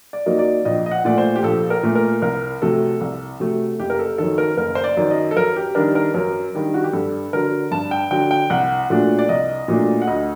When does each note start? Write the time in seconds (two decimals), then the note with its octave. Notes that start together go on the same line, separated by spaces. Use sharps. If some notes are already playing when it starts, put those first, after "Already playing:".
0.13 D5
0.26 F#2 F#3 A#3 D#4
0.39 D5
0.65 A#1 D#5
0.86 D#5
0.91 F#5
1.05 A#2 A3 D5
1.18 C5
1.36 G4
1.43 A#1 A4
1.70 A#4
1.83 A#2 A3
1.95 A#4
2.22 C2 A#4
2.62 C3 F#3 A3 A4
3.01 C2
3.40 C3 F#3 A3
3.79 F#1 G4
3.90 A#4
3.99 A4
4.18 F#2 D#3 A4
4.38 A#4
4.57 F#1 A#4
4.75 C5
4.84 D5
4.97 F#2 D#3
5.11 D#5
5.31 A4
5.36 F#2 A#4
5.56 G4
5.75 D#3 G3 D4 A#4
5.95 A#4
6.14 F#2 A#4
6.54 D#3 G3 D4
6.74 F#4
6.84 G4
6.93 G2 A4
7.33 D3 F#3 A#4
7.71 G2 A5
7.91 G5
8.11 D3 F#3 G5
8.31 G5
8.50 C2 F#5
8.90 A#2 F#3 A3 D4
9.19 D5
9.29 C2 D#5
9.68 A#2 F#3 A3 D4
10.02 F#5
10.07 D2 D#5